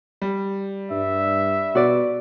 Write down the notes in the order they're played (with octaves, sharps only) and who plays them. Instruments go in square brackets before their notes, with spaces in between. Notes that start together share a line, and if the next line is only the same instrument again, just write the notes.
[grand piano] G3
[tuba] G2 [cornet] E5
[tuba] B2 [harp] F#4 D5